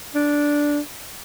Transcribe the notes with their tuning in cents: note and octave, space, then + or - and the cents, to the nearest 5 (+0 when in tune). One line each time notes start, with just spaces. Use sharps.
D4 -5